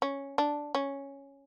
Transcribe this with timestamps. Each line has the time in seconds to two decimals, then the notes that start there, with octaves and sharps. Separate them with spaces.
0.02 C#4
0.38 D4
0.75 C#4